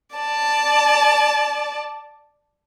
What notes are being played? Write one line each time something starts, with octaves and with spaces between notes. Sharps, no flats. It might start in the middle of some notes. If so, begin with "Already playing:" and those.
D5 A5